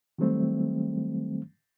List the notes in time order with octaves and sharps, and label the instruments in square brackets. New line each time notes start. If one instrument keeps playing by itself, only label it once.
[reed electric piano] D#3 F#3 G3 A3 C4